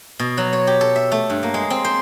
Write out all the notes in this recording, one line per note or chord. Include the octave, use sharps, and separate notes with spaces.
B2
F#3
C#5
G4
A4
E5
A3
G2
A#3
G#3
C4
C5